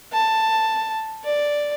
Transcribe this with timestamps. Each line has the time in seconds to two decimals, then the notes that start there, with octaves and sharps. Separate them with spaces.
0.12 A5
1.24 D5